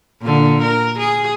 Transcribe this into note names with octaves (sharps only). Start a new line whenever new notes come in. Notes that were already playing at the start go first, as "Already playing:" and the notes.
A#2 D3
A#4
G#4